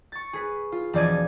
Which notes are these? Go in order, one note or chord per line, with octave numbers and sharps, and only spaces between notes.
C#6 A6
G#4 B4
F4
E1 F3 D5 D#5 G#6 D#7